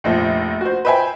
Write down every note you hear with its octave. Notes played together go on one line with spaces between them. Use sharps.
F1 A#1 F3
F#4 C5
B4 C5 E5 G5 G#5